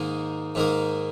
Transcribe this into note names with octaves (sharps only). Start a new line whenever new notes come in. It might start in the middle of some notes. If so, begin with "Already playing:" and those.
Already playing: G#2 D#3 A#3 D#4
G#2 D#3 A#3